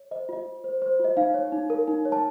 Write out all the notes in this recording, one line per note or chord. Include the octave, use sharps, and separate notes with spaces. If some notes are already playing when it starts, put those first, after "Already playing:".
Already playing: C#5
C5 D#5
F4 D#5
F4
C5
C5
F4 D#5
D#4 F5
C#5
D#4
A#4
D#4
C#5
A5